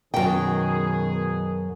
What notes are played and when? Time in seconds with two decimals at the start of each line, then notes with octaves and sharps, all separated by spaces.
0.14 F#2 B2 D#3 G#4 G5